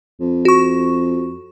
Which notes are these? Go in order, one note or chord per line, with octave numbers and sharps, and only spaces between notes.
F2
F#4 C#6